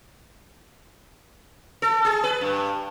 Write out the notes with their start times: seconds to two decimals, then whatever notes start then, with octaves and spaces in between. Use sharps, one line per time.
1.82 A4
2.05 G#4
2.24 B4
2.41 G2